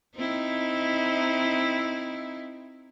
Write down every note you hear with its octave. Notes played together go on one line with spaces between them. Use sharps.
C4 D#4 E4